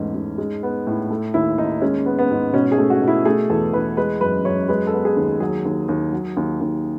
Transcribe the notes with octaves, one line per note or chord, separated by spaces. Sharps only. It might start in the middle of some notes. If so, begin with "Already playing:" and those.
Already playing: E2 G#2 A3 C#4
G#2
G#3
B3
A2
A3
D#2 E4
D#2 D#4
G#3 C#4
B3
B3
G#2
B2 C#4
G#4
A3
F#4
B2
E4
A3 G#4
E2 A4
E2 B4
G#3 B4
F#2 B4
F#2 C#5
G#3 B4
A4
B3
G#4
D#2
F#3 G#4
D#2
D#2
F#3
D#2
D#2